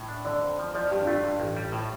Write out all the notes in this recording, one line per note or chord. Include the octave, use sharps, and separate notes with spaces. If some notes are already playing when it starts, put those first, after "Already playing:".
Already playing: A2
D4
D3 D5
F2
F3
F3 D5
G2 G4
D4
A3 F4
G2
A1
G3
A2